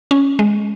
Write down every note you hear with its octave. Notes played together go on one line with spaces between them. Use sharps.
C#4
G#3